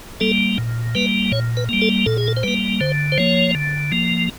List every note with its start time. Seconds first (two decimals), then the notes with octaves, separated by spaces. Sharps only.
0.20 G3 A#3 A4
0.58 A#2
0.95 G3 A#3 B4
1.32 A#2 C#5
1.57 B4
1.69 G3 A#3
1.82 A4
2.06 A#2 A4
2.18 G#4
2.28 A4
2.37 C5
2.43 G3 A#3 B4
2.81 D3 C5
3.12 C5
3.18 F3 A#3 C#5
3.55 D3
3.92 F3 A#3